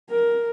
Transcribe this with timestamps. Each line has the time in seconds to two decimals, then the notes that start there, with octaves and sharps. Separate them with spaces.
0.10 A#4